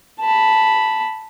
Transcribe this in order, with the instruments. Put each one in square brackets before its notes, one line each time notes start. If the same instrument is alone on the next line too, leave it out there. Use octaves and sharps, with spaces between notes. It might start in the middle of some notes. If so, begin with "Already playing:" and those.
[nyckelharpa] A5 B5